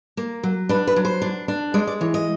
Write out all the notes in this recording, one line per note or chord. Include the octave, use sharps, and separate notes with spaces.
A#3
F#3
D4 B4
B4
F#3
C5
D4
D4
G#3 D5
D5
E3 C#5
D#5